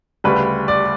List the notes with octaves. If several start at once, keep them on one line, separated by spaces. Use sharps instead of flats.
D2 C#3 G3 B4
D5